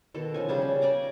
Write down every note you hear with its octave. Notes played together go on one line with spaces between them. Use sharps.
B2 D#3 A4
F3 C#4 G#5
C#3 G3 A5
C#3
D5 G#5 A#5 D6